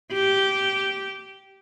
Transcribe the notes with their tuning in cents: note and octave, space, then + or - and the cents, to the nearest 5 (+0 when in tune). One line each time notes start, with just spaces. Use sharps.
G4 -10